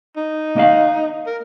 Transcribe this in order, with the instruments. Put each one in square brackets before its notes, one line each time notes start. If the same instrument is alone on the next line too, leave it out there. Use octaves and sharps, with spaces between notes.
[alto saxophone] D#4
[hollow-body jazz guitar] A#3 D#5 F5
[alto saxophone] A#4